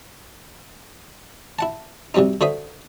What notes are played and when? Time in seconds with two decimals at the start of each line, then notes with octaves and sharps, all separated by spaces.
1.59 E4 F#5 A5
2.14 C3 F#3 G3 C4 D#4
2.41 D3 F#4 C5 E5 D#6